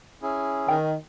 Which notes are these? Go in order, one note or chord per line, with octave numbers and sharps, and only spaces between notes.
C#4 E4 G#4
D#3 G5